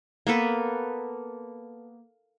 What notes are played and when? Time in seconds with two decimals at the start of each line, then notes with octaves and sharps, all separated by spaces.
0.27 A#3 B3 A4 B4